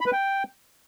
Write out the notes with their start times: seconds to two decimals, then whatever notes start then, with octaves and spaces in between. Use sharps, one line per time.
0.01 B5
0.06 B4
0.12 G5